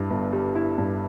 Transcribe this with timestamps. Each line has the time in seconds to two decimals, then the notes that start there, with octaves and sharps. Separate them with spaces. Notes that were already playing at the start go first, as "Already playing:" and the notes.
Already playing: G2 G3 E4
0.10 G1
0.33 G3
0.55 E4
0.78 G2